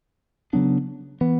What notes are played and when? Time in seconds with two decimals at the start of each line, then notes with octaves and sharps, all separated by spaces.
0.53 C#3 F#3 B3 D4
1.21 E3 B3